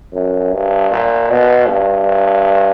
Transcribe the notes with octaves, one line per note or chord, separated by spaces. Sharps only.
F#2
G2
A#2
B2
G2